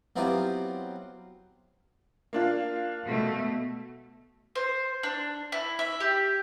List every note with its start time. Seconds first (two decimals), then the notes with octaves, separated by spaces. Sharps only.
0.16 F#3 B3 C4 E4 F4 G4
2.33 A#3 D4 F4
3.04 B2 A3
4.55 C5
5.03 D4
5.52 E4
5.79 E5
6.00 G4